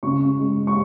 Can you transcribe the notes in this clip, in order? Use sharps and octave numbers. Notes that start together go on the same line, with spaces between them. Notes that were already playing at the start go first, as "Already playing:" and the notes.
C#3 C#6
G#3
C#6